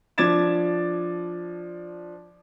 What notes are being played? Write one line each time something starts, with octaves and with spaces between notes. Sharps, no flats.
F3 D4 D6 G#6 A6 E7